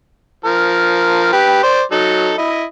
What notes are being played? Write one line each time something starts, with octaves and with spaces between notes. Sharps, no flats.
F3 A#4
G4 B4
C5 D5
F#3 D#4 A4
E4 D#5